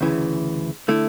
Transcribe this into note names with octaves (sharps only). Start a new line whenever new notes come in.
D2 C#3 E3
D3 A3 E4